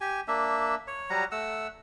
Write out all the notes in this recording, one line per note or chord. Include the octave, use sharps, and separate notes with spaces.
G4 G#5
A#3 D4 E5
C#5
F#3 G3 F#5 A#5
A3 F#5 E6